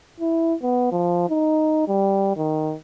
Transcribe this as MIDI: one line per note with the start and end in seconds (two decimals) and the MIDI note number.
0.20 0.54 64
0.62 0.91 59
0.92 1.25 53
1.29 1.84 63
1.87 2.36 55
2.37 2.74 51